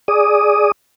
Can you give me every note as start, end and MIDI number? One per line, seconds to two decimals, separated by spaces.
0.08 0.72 68
0.08 0.72 74
0.08 0.72 87